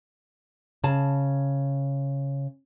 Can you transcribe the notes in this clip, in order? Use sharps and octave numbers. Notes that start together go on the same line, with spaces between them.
C#3 A5